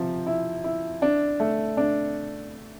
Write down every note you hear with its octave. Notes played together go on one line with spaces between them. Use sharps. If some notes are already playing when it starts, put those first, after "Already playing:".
Already playing: C3 F3
E4
E4
D4
A3
D4